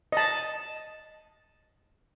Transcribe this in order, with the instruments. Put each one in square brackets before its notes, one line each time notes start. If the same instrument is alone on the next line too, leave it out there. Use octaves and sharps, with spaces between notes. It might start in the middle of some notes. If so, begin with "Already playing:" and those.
[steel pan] D#5 A5